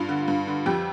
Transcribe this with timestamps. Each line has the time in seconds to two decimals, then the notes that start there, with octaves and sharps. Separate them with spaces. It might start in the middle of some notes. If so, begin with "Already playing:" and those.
Already playing: G2 F4
0.09 D3
0.28 G2
0.47 D3
0.66 F2 G4